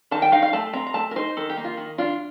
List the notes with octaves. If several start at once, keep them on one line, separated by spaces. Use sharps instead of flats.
D#3 A5
G5
D#4 F5
F5
A3 A5
C4 A#5
A#5
A3 A5
A#4
D#4 C5
D#3 A4
G4
A#3
F4
D#3
D4 F4